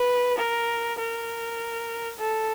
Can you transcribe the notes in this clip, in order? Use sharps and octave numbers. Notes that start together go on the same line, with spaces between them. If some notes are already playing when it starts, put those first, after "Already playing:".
Already playing: B4
A#4
A#4
A4